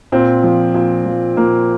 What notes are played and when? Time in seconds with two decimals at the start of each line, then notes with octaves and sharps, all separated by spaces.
0.12 A#2 C4
0.43 F3
0.74 A#2
1.06 F3
1.37 A#2 A#3